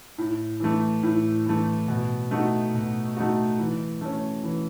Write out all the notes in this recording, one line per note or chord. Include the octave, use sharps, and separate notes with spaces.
A2
E3 A3
A2
E3 A3
B2
A3 D#4 F#4
B2
A3 D#4 F#4
E3
A3 C#4
E3